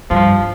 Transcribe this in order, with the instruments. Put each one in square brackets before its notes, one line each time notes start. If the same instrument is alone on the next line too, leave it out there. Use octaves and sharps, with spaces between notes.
[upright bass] G2 [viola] F3